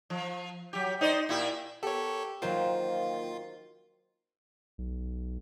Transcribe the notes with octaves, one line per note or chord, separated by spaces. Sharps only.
F3
F#3 G4
D#4 C5 D5
A#2 E4 G4
B3 G4 A4 A#4 C#5
D#3 F3 F#3 A#3 F4 C5 G5
B1